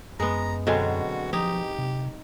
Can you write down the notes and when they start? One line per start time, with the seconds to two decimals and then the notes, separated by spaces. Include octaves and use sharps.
0.20 F#2 G#3 B3 A#5
0.67 B2 D3 F#3 G#3 C4 F#4
1.33 F3 D#4 G4
1.79 C3